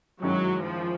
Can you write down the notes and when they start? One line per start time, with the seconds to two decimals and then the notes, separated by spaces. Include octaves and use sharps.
0.22 F#2 D#3 F#3 G#3 C#4 E4
0.64 F3